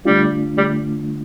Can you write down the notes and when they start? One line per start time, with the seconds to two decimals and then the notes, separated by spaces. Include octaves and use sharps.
0.05 D3 G3 A3 D4 F4
0.57 D3 G3 A3